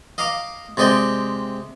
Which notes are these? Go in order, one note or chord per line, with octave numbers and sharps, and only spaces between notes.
D#5 F5 A#5 D6
C3 G#3 D5 D#5 G5